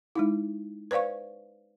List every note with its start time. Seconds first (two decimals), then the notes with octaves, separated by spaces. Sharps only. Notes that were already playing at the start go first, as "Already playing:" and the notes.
0.15 G#3 D#4 E4
0.91 B4 C5 D5 F5 C#6